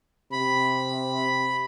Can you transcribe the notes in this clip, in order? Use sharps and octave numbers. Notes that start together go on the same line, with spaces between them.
C3 B5